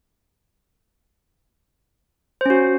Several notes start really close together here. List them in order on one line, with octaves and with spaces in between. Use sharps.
C5 C#4 F#4